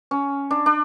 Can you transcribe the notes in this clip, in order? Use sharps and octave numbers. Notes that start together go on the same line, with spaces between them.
C#4
D4
D4